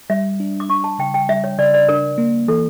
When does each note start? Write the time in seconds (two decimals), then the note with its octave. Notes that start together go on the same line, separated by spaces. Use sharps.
0.10 G3 E5
0.40 D4
0.60 D6
0.69 D4 C#6
0.84 A5
0.99 C#3 G5
1.14 G5
1.29 G3 E5
1.44 C#5
1.58 C#3 D5
1.74 D5
1.89 D4 A#4
2.18 A#3
2.48 E3 A4